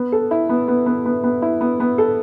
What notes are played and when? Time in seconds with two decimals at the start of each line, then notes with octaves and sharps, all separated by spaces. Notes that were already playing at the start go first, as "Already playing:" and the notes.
Already playing: B3
0.12 A4
0.31 E4
0.49 B3
0.68 B3
0.86 B3
1.06 B3
1.24 B3
1.42 E4
1.61 B3
1.80 B3
1.98 A4